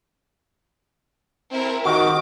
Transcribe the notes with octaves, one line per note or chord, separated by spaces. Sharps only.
C4 E4 A#4
D#3 F#4 D6